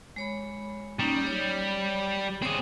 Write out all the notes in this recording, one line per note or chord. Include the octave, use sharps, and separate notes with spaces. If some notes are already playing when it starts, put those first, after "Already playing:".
G#3 C#5 B5
G3 A#3 C#4 D#4
C#5
C4 G#4 C#5 D6